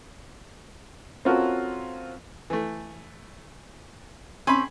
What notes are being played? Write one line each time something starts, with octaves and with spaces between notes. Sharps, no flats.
C4 C#4 F4 F#4 A4 A#4
E3 A3
C4 C#4 G#5 B5